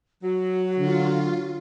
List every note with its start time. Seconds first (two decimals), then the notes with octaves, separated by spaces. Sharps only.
0.24 F#3 F#4
0.79 D3 F4